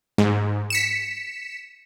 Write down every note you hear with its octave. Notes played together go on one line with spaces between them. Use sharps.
G#2
B6 C#7 E7